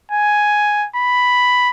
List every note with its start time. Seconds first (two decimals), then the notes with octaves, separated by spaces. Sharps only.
0.11 G#5
0.96 B5